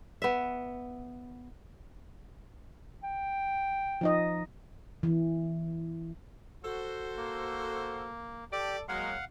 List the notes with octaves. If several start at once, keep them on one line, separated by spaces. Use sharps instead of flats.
B3 E5
G5
F3 D#4 D#5
E3
F#4 A4 C5
A#3
G4 A4 D5
F#3 G#3 A#3 F5 F#5